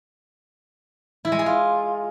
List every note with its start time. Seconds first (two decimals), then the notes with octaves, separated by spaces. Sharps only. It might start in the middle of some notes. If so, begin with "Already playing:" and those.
1.25 E4
1.32 G#3
1.39 G#4
1.46 F4